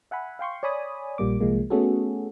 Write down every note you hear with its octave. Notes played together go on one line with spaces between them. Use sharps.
E5 F#5 G#5 B5
F5 G5 C6 C#6
C#5 D5 G#5 B5 D#6
A#1 A#2 G3 A#3 D6
C2 F3 G#3 A#3
A3 B3 C#4 F#4 G#4 A4